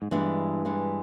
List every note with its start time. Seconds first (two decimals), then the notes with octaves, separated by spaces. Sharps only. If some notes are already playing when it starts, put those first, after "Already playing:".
0.02 G#2
0.11 G2 E3 G#3 B3 D4
0.65 E3 G#3 B3 D4